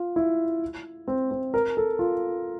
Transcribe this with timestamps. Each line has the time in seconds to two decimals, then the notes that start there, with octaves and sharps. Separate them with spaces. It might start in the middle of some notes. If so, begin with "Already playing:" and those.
Already playing: F4
0.16 E4
1.08 C4
1.31 C4
1.54 A#4
1.77 A4
1.99 F4